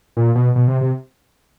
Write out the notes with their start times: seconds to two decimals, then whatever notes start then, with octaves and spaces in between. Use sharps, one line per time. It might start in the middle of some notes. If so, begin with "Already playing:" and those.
0.17 A#2
0.35 B2
0.56 B2
0.68 C3
0.81 C3